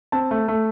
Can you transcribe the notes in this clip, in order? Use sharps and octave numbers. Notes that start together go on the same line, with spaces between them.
C4 A5
A3
A3